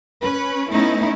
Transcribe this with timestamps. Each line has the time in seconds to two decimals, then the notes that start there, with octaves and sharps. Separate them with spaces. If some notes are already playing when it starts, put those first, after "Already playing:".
0.22 C#4 B4
0.71 A3 B3 C#4 D#4 E4